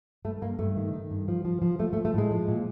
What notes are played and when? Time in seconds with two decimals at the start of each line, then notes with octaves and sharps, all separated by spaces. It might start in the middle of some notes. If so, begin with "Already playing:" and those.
0.25 G2 A3
0.42 G2 A#3
0.59 G2 A3
0.77 D#3
0.93 D#3
1.11 G2
1.28 F3
1.45 F3
1.62 F3
1.79 F3 A3
1.93 A3
1.97 F3
2.05 A3
2.14 A2 G#3
2.31 F3
2.48 A#2